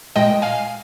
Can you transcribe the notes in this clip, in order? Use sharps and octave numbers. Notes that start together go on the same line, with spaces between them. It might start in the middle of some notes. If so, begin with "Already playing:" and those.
A#2 G#3 D#5 G5
F5 G#5